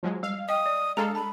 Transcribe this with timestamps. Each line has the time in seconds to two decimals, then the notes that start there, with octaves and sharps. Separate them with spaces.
0.03 F3 F#3 G#3
0.23 G3 F5
0.49 D#5 G5 D#6
0.66 D5
0.97 G#3 D4 A4 F5 A#5
1.15 A5 B5